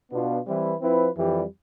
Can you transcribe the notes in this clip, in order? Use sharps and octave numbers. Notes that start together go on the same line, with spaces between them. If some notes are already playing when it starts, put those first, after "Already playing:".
B2 B3 D4 F4
E3 G3 C4 E4 B4
F3 C4 E4 B4
F2 E3 G3